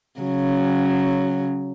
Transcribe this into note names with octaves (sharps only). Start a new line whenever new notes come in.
C#3 F#3